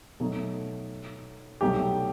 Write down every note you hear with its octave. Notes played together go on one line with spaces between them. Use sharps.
B2 F#3 A3 D#4
C2 B2 F#3 A3 D#4 G4